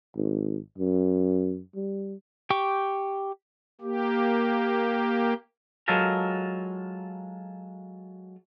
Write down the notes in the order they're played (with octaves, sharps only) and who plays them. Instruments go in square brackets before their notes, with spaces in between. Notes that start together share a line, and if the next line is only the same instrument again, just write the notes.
[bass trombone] G#1
F#2
G3
[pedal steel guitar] G4 G5 C#6 D6
[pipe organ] A#3 G4
[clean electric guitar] F#3 G#3 F4 A4 A#4